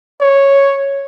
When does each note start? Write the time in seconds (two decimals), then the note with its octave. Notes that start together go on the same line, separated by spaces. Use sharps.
0.20 C#5